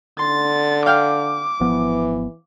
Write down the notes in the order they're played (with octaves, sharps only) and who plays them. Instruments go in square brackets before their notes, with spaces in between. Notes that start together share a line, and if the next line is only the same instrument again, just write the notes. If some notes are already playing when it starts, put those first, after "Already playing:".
[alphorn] D3 [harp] C6 [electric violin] A6
[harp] F5 G5 F6 [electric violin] D6
[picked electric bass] G#1 F3 B3 [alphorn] E3